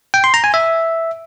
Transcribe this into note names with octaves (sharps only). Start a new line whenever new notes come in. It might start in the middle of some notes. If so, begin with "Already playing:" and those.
G5
C6
A#5
G#5
E5